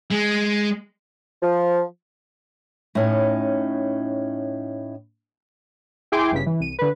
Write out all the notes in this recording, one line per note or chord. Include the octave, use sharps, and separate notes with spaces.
G#3
F3
A2 C#4 D#4
E4 G#4 G5 G#5 C6 D6
G1 G2 C#3 B6
E3
C2 D#7
D3 B4